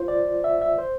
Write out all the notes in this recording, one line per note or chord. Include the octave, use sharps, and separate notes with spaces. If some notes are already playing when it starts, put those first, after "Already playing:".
Already playing: F4 C5
D5
E5
E5
C5